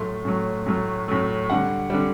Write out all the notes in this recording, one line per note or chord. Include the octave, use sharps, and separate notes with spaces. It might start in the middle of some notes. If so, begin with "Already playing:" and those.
Already playing: A2 F#3 A3 C6
A2 F#3 A3
A2 F#3 A3
A2 F#3 A3
D3 G3 F#5
D3 G3